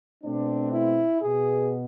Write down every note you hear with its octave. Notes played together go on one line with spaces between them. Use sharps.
B2 A3 C4 D4
E4
B2 B3 G#4